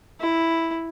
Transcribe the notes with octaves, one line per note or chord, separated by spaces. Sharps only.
E4